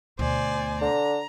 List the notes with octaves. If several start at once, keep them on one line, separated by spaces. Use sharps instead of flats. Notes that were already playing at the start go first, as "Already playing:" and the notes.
D2 B2 C5 D5 G#5
D3 A#5